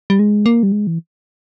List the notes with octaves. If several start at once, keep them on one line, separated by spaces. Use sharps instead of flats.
G3
G#3
A#3
G3
G#3
E3